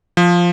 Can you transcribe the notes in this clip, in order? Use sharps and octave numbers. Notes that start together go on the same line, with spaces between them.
F3